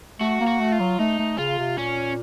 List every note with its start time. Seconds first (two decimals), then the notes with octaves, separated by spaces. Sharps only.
0.20 A3 F#4
0.40 A#3
0.47 F#4
0.60 A3
0.72 F4
0.80 F#3
0.99 A3 D#4
1.19 A3
1.38 C#3 F4
1.58 C3
1.77 A#2 C#4